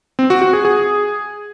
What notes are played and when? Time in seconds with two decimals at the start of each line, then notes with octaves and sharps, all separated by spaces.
0.19 C4
0.30 F#4
0.42 F#4
0.53 G#4
0.65 G#4